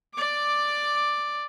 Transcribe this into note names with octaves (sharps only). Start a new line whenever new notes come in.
D5 D6